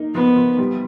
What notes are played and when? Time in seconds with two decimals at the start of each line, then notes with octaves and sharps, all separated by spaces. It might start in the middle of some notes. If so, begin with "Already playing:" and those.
Already playing: A#3 D#4
0.14 F3 B3
0.36 F3
0.59 G3